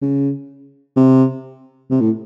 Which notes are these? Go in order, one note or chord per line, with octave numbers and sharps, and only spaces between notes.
C#3
C3
C3
A2